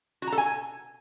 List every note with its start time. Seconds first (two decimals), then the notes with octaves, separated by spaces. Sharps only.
0.22 F#4
0.27 A#5
0.32 A4
0.38 G#5